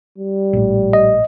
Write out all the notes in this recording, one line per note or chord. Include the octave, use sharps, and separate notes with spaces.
G3
A#1 A2
D#5